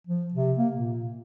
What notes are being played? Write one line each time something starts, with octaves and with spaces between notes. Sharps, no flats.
F3
C3
A#3
A#2